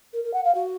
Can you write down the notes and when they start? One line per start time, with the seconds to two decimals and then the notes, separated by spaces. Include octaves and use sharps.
0.13 A#4
0.24 A#4
0.33 F#5
0.44 F5
0.55 F#4